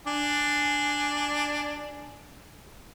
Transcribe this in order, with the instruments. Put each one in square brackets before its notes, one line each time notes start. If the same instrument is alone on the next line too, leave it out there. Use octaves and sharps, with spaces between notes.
[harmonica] D4 G#5